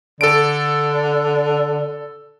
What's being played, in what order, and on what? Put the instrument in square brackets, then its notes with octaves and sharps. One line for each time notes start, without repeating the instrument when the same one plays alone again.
[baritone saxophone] D3 [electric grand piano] A4 D7